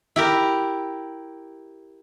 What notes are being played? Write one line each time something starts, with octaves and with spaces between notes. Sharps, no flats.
E4 G4 A#4